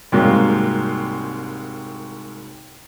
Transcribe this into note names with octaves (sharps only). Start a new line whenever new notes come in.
C2 G#2 F#3 G3 A#3